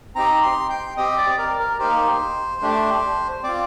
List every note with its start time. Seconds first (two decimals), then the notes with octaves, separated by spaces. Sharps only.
0.15 C4 D#4 G4 A#5
0.43 C6
0.69 G5
0.97 C4 G4 D#5
1.18 D5
1.38 A#4
1.59 A#4
1.79 A#3 D#4 G4 C5
2.62 A3 D4 G4
3.44 C4 F4 D5